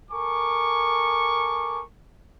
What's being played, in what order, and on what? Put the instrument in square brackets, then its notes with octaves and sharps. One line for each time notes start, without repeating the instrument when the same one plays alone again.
[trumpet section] A4 A#4 G#5 C#6 D6